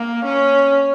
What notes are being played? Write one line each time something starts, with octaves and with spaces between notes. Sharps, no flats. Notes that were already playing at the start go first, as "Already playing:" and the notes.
Already playing: A#3
C#4